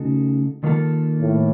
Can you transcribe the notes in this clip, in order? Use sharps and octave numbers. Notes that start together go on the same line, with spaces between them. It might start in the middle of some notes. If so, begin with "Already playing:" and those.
Already playing: C#3 A3 D#4 F#4 A4
D#3 A#3 F4 A4
A2